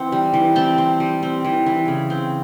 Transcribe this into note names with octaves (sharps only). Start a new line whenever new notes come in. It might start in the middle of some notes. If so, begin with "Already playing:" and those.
Already playing: E3 C4 F#5
G3
E3
C4 G5 A5
C4
G3
C4
E3
E3
C#3
C4